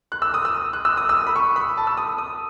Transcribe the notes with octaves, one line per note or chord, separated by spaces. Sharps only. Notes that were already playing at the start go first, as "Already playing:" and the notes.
F#6
E6
D#6
E6
F#6
E6
D#6
E6
B5
C#6
B5
A5
E6
D#6
D#6